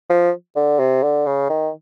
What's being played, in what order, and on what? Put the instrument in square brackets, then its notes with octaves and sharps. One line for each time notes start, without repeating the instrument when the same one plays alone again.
[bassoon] F3
D3
C3
D3
C#3
D#3